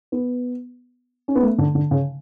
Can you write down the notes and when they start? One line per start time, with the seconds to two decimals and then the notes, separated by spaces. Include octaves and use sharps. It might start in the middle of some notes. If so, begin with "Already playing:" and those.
0.12 B3
1.28 C#4
1.36 B3
1.42 A3
1.58 D3
1.75 D3
1.91 C#3